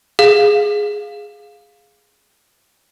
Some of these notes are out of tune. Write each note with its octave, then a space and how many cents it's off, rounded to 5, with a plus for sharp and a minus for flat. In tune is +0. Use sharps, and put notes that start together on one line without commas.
G#4 +0 F5 +10